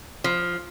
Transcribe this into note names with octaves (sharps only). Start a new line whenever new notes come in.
F3